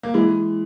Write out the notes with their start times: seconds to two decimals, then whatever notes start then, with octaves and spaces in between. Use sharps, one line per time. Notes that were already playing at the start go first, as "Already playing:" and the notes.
0.03 A#3
0.14 E3 G#3